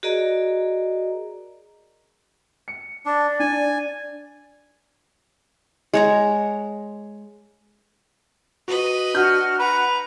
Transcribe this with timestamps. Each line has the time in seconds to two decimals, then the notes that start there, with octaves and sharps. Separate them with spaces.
0.03 F#4 G#4 A#4 D5 D#5 A#5
2.68 C#7
3.06 D4 D5
3.40 D4 G#5
5.93 G#3 C#5 A#5
8.68 F#4 B4 D#5
9.14 D4 F#4 F6 G6
9.59 B4 F#5 A#5